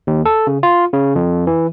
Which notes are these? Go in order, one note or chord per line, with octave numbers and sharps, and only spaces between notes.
D#2
A4
C#3
F4
C#3
F2
E3